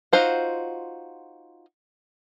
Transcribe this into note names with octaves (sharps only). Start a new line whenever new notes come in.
D#4 F4 F#4 C5 F#5